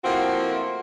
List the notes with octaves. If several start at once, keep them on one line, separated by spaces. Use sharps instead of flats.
F3 A3 A#3 C4 E4 F#4